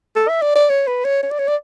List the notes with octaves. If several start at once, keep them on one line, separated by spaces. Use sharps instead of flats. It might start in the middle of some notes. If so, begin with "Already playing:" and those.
A4
E5
D5
D5
C#5
B4
C#5
C#5
D5
C#5
D5